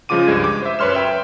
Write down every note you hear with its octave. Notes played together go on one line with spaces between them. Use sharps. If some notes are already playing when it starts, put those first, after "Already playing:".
C#3 F3 G#3 F4 D6 D#7
C#2 G2 G#3 G#6
D6
C5 E5
F#2 B4 C#5 C6 F6 E7
E5 G5